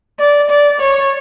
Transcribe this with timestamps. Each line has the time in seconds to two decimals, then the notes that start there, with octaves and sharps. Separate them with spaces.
0.19 D5
0.50 D5
0.80 C#5